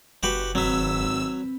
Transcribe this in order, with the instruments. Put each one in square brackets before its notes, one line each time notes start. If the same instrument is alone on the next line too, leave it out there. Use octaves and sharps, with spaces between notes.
[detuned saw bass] F#1 [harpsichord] F#4 G4 B4
[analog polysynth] G#1 E6 [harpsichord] F#3 [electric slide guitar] C4 B4